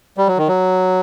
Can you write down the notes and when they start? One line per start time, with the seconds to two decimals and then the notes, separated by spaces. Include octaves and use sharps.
0.17 G3
0.27 F#3
0.38 D#3
0.48 F#3